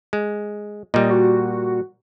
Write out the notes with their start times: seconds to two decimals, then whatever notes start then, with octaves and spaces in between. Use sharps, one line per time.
0.13 G#3
0.94 A#2 G3 D#5
1.11 F#4